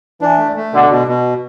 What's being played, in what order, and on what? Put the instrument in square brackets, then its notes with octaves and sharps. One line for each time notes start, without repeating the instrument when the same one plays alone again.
[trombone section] E3 [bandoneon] D4
[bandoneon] A3
A3
[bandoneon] B2 [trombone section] D3
[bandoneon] B2
B2